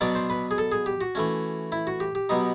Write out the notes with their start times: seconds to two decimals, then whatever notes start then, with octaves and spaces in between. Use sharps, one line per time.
0.01 B2 F#3 B3 D4 D5
0.15 C5
0.30 B4
0.51 G#4
0.58 A4
0.72 G#4
0.86 G4
1.01 F#4
1.15 E3 A3 C#4
1.72 E4
1.87 F#4
2.00 G4
2.15 G4
2.29 B2 F#3 B3 D#4